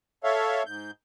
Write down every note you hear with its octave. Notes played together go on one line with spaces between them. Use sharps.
A4 C#5 E5 F5
G#2 G6